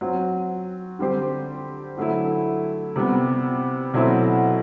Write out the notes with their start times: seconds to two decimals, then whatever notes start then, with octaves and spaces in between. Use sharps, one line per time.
0.01 F#3 C4 F#4
0.99 D3 G3 C4 G4 C5
1.97 D3 F#3 A3 E4
2.96 C3 G3 B3
3.94 B2 F#3 A3 C4 E4